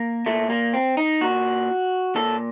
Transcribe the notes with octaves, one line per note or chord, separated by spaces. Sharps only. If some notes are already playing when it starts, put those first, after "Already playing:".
Already playing: A#3
A#2 A3
A#3
C4
D#4
A#2 F#4
A#2 A4